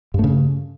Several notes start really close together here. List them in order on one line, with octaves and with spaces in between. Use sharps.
G2 A3 C#3